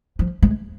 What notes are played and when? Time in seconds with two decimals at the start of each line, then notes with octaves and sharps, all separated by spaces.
0.19 F3
0.42 G#3